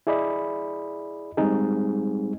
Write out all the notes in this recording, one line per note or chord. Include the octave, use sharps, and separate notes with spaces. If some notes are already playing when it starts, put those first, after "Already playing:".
E4 G#4 D5 D#5 B5
G3 G#3 C4 D#4 G#4